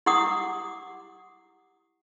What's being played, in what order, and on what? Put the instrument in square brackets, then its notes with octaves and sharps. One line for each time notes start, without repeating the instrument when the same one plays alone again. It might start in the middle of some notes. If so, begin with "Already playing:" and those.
[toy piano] E4 G4 F#5 D6 D#6